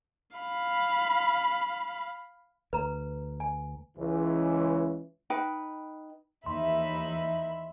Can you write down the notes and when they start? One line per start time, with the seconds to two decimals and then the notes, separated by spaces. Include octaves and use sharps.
0.37 F5 B5
2.73 D2 B4 A#5
3.40 G#5
3.98 C#2 E3
5.30 D#4 B4 G5 B5
6.46 D#2 E3 F3 D#4 E5 B5 C6